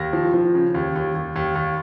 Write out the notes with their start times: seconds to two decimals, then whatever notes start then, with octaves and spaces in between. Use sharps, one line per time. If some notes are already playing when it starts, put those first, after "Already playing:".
Already playing: D#2 A#6
0.13 F3
0.34 F3
0.55 C#3
0.74 D#2
0.96 D#2
1.15 D#2
1.36 D#2
1.56 D#2